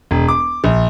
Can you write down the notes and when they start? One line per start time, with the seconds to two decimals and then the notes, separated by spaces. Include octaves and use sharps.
0.11 E1
0.28 D6
0.64 A#1